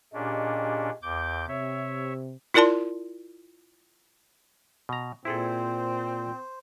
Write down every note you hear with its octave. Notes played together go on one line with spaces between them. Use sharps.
A#2 C#4 D4 G4 G#4 D#5
E2 D6 G6
C3 C#5 E5
E4 F4 A#4 D5 A5 C6
B2 A#5
A#2 C4 E4 G#4 A4 C5